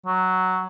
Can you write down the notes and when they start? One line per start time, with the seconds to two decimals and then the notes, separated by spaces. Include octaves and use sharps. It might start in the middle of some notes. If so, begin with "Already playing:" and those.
0.06 F#3